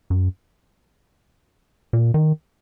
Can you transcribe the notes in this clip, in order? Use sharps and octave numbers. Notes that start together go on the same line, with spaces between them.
F#2
A#2
D#3